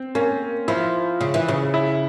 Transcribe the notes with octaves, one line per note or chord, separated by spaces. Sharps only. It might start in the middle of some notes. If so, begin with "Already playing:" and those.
Already playing: C4
A#3 C#4
F3 E4
C#3
E3
C#3
E4